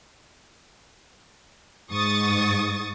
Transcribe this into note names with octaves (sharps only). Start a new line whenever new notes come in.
G#2 C#6 D#6 A6